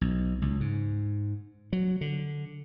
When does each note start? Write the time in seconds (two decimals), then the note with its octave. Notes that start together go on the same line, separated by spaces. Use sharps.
0.01 B1
0.42 C#2
0.60 G#2
1.73 F#3
2.01 D3